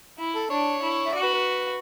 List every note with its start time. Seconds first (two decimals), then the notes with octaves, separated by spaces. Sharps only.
0.19 E4
0.35 A4
0.50 D4 C#5
0.82 E4
1.06 E5
1.13 F#4 D5
1.23 B4
1.34 B4